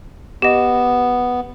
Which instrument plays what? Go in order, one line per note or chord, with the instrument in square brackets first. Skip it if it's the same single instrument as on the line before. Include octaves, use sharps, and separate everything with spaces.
[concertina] B3 [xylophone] G4 D#5